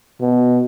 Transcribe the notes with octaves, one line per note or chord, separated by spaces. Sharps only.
B2